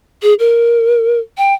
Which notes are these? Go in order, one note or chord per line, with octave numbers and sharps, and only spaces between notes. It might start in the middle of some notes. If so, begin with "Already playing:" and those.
G#4
A#4
G5